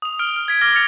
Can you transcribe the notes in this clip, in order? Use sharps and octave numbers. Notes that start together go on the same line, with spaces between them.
D#6 F7
F6 D7 G7
F6
G#6 B6 D7
D6 F6 A#6 G7
F6 G#6 A6 C#7 F7